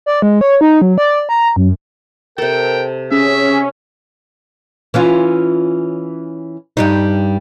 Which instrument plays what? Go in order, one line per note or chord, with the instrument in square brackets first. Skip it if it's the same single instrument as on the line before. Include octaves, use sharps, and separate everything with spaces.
[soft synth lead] D5
G#3
C#5
D#4
F#3
D5
A#5
F#2
[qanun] C3 A4 [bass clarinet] A#4 [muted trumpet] G5
[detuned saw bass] C#4 [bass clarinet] G#4 [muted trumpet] E5
[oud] E3 C#4 F4
G2 G3 D#4